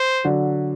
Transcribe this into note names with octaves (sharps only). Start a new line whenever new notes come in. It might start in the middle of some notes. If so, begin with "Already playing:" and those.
Already playing: C5
D3 F#3